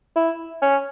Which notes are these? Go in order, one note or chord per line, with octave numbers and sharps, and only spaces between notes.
E4
C#4